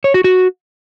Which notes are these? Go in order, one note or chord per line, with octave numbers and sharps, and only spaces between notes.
C#5
F#4
F#4